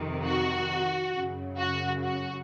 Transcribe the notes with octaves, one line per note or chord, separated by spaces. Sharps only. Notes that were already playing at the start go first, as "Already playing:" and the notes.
Already playing: F2 C3 D#3
F#4
F#2 C#3
F#4
F#4